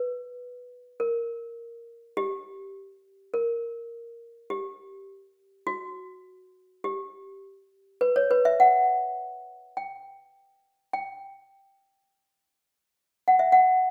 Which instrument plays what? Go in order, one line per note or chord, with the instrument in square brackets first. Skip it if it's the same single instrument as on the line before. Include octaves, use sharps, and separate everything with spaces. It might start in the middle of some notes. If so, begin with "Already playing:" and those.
Already playing: [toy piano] B4
A#4
G4
A#4
G4
F#4
G4
B4
C#5
B4
E5
F#5
G5
G5
F#5
E5
F#5